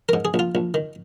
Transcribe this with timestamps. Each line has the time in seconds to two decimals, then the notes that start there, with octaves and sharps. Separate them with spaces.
0.09 G#2 A#4
0.25 G#4
0.34 A#1
0.39 F4
0.55 A#1
0.74 D#3